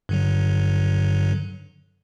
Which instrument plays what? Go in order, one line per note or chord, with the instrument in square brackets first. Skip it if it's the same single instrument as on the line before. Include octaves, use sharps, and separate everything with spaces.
[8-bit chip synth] G2 D3 F#3